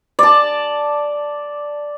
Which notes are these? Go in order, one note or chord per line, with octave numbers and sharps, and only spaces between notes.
D5 A5